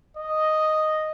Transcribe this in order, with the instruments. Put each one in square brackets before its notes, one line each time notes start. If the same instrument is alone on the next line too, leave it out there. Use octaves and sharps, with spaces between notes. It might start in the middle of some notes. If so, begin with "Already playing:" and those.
[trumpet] D#5